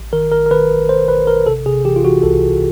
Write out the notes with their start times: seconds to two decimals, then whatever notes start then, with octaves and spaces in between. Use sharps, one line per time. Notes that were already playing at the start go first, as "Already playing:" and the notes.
Already playing: A1
0.13 D#3 A#4
0.32 A1 A#4
0.46 A#4
0.51 D#3 B4
0.70 A1
0.89 A1 C5
1.08 A1 B4
1.27 A1 A#4
1.46 C3 A4
1.66 C3 G#4
1.85 E3 G4
1.96 F4
2.04 E3 F#4
2.23 C2 A4
2.42 C2